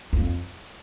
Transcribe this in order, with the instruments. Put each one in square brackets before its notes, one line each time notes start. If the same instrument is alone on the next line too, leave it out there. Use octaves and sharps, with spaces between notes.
[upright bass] F2